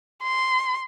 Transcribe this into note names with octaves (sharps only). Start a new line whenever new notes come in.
C6